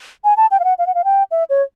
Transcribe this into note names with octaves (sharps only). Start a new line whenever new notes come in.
G#5
A5
G5
F5
F#5
F5
F#5
F5
G5
E5
C#5